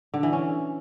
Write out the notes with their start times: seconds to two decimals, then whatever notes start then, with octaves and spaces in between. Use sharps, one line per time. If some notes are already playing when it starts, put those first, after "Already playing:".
0.14 D3
0.23 E3
0.33 C#4